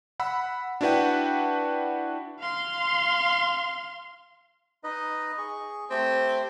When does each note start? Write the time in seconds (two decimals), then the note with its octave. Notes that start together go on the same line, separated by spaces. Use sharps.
0.20 F#5 B5 E6
0.81 D4 E4 F#4 B4 F#5 G5
2.39 F5 C6
4.84 D#4 B4 D#5
5.38 G#4 C#6
5.90 A3 C4 G4 C5